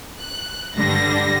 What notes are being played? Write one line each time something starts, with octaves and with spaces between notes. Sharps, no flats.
F#6
G2 D3 G3 A#6